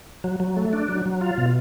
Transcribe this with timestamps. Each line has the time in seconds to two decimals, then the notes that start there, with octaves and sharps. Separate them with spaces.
0.24 F#3
0.40 F#3
0.57 A3
0.73 D4
0.88 F#3
1.06 F#3
1.21 F4
1.38 B2